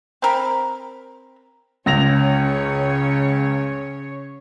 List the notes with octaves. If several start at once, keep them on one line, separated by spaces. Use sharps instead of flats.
C4 A#4 B5
C#2 C#3 C#5 A#6 F7